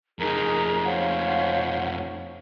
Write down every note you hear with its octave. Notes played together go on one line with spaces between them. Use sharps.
F2 D#4 G#4 A#4 A#5
C5 C#5 F5 F#5